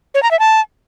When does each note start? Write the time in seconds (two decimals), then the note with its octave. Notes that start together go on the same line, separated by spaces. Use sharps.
0.14 C#5
0.23 A#5
0.31 E5
0.39 A5